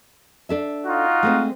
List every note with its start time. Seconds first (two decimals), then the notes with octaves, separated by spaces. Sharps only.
0.49 D4 A4 E5
0.86 D#4 F4 F#4
1.23 G#3 A3 C4